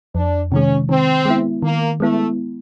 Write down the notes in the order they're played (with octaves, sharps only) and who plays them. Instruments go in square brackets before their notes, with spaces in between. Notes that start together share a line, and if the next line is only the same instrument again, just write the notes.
[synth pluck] F2 [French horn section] D4
[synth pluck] C3 D#3 G#3 [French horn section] C#4
[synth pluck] D#3 [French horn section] C4
[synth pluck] G#3 B3 E4
[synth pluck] D#3 [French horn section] A#3
[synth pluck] G#3 B3 E4 [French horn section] A3